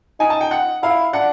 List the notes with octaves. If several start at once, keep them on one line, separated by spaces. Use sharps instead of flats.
D#4 G#5
A5
G5
F#5
E4 F5
D4 F#5